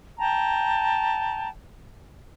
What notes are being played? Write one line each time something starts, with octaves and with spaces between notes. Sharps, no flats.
G5 A5 A#5